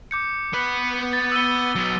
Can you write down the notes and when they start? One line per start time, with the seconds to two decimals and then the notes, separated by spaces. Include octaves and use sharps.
0.11 D6 G6 C#7
0.53 B3 B4
1.13 A6
1.32 E6 D#7 G7
1.75 F#3 B3